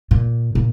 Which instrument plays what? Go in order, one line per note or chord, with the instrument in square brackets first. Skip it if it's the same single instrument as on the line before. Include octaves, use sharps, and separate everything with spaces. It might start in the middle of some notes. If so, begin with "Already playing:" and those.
[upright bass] A#2
A#2